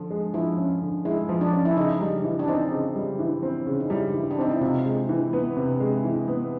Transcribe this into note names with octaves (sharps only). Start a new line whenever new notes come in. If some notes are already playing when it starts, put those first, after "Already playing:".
Already playing: D3 F3
G#3
F3 E4
C#4
D3
G#3 E4
F3
D4
C#4
E4
C#3 D#4
G3
E3
D4
C4 D#4
C#3
G3
E3
C4
C#3
D#4
G3 E4
E3
D4
C4 D#4
E4
C3 F4
G#3
E3
B3
C3
G#3
E3
B3